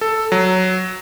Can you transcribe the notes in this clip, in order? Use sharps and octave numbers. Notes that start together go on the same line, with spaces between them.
A4
F#3